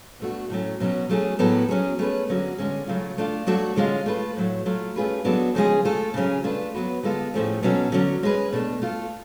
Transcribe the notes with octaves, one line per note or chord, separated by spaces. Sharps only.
B2 A3 D4 F#4
A2 F#3 A3 C#4
B2 F#3 C#4 F#4
F#3 A3 C#4 G#4
A2 F#3 B3 F#4 A4
F#3 C#4 G#4
A3 C#4 G#4 B4
D3 F#3 C#4 F#4
D3 G#3 C#4 G#4
C#3 F#3 A3 F4
A3 D4 F4
F#3 A3 D4 F#4 A4
D3 G#3 C#4 F4
A3 F4 B4
A2 F#3 A3
F#3 A3 F4
A3 C#4 F4 G#4 B4
F#3 B3 D4 F#4 A4
C#3 F3 G#3 C#4 G#4
A3 F4 A4
C#3 F#3 C#4 G#4
A3 D4 F4 B4
F#3 B3 F#4 B4
D3 G#3 B3 F4 A4
A2 F3 A3 C#4 G#4
B2 F#3 C#4 F#4 A4
D3 F#3 C#4
G#3 C#4 G#4 B4
B2 A3 D4
A3 F4 A4